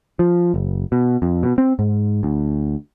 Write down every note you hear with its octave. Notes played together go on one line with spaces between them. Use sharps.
F3
F#1
B2
F2
B2
C4
G#2
D2